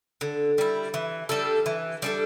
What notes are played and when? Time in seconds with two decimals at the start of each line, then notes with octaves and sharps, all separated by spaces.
0.21 D3
0.58 G3 E4
0.94 E3
1.29 G3 D4 A4
1.66 E3
2.02 G3 D4 A4